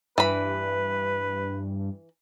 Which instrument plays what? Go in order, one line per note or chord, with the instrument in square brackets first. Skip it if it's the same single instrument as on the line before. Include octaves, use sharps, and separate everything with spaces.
[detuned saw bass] G2 [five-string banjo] E3 B5 [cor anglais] B4